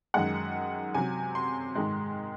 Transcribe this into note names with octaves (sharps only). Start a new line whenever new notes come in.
F#2 D#3 G#3 F#5
C3 F#3 G#5
C6
G#2 D#3 G#3